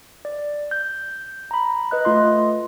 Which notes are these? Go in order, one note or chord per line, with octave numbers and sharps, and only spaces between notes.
D5
G6
A#5 B5
B4 D#5 F#6
A3 F4 D#5 C6